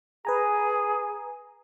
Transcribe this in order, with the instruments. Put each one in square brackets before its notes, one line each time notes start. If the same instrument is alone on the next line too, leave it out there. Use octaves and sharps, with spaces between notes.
[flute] G#4 [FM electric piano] B4 G#5 A#5